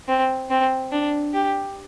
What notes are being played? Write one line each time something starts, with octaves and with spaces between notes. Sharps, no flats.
C4
C4
D4
G4